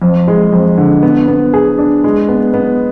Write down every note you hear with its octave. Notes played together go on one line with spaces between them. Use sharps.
F2
G#3
F2
D3
B3
B3
G#4
D4
G#3
B3
B3